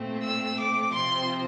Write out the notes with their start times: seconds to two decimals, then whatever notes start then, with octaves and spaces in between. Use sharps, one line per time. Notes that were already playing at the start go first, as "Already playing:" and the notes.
Already playing: A#2 A3 C4
0.23 E6
0.59 D6
0.93 C3 F3 C4 C6